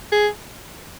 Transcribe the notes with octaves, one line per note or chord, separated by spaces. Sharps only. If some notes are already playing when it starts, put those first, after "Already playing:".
G#4